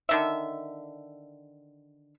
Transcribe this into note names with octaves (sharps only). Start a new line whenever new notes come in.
D3 D#3 E5